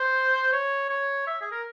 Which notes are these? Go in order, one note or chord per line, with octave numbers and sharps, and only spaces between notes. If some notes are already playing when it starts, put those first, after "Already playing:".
Already playing: C5
C#5
C#5
E5
G#4
A#4